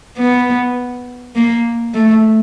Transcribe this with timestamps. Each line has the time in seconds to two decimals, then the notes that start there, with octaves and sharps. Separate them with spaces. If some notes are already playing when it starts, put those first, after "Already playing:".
0.18 B3
1.35 A#3
1.94 A3